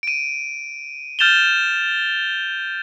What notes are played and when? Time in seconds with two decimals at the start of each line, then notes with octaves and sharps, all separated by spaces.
0.03 D7 D#7
1.19 F6 G6 A6 E7 F7 G7